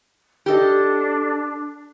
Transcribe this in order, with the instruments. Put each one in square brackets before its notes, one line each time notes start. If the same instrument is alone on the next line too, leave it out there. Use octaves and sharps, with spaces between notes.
[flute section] D4 [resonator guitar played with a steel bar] G4 A4 D#5